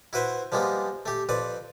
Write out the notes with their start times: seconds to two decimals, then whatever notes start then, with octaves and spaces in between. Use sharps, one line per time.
0.13 E4 F#4 B4 C5 E5
0.52 F3 G3 G#3 A#3 B3
1.06 A3 G4
1.29 F2 C4 B4 D5